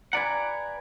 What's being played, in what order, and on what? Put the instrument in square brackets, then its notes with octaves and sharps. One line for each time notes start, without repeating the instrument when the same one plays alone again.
[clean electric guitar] B4 D5 F#5 [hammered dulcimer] G#5 A#5